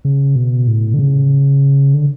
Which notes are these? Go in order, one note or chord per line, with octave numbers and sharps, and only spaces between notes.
C#3
B2
A2
D3
C#3
D3